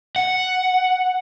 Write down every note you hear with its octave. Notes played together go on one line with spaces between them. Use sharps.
F#5